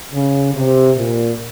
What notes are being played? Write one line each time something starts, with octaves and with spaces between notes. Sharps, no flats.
C#3
C3
A#2